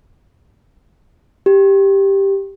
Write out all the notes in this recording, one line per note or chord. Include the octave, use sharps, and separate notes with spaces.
G4